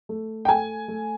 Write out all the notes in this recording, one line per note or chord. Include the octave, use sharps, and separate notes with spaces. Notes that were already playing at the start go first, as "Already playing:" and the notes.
A3
G5
A3 G#5
A3